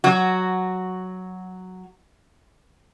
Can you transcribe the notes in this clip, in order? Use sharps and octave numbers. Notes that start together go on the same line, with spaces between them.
F#3 F#4